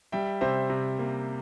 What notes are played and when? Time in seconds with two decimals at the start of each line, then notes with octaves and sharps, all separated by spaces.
0.12 G3 E5 G5
0.41 C3 C5 E5
0.70 C3
0.99 A#3